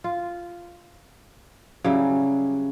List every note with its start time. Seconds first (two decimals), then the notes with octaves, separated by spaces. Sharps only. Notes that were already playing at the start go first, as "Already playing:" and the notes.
0.04 F4
1.84 C#3 F#3 G3 E4